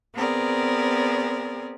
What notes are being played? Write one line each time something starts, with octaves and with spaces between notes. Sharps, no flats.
B3 C4 G#4 A#4 D5